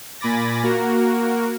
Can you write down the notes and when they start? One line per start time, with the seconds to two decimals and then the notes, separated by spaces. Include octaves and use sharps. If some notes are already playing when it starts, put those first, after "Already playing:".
0.20 A#2 G#5 B5 D6 A6 A#6
0.63 A#3 F#4 A#4